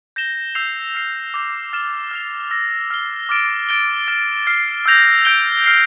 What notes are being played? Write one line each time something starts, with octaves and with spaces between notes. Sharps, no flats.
G6 A#6 E7 G7
E6 G6 C7 F7
F6 C7 G7
D6 G6 A#6 F7
F6 A6 E7 G7
F6 A6 C7 F7
E6 A#6 F7
F6 C7 G7
D6 F6 A6 D7
A6 D7 G7
F6 A6 E7
F6 A6 C7
E6 G6 A#6 F7
G6 D7 G7
F6 C7 G7